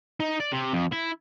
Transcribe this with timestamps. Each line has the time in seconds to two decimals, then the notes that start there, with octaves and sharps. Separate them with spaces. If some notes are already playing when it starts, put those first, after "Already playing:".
0.20 D#4
0.40 D5
0.52 C3
0.73 F2
0.92 E4